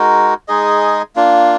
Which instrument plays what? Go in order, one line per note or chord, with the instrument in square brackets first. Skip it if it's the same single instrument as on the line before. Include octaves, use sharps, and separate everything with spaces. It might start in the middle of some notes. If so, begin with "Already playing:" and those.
Already playing: [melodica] G#3 D#4 F#4 A#4
G#3 D#4 G#4 D#5
A#3 D4 F4